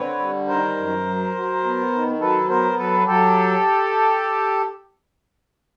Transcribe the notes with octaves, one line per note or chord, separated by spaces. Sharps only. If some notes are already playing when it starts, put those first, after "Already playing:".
Already playing: D3 C4 B4 C#5
G3
D#3 A#4 C5
F#2
F#3
F#3
B3
D#3
F#3 A4 B4
B3 A#4 C5
F#3 A4 B4
F#3 G4 A4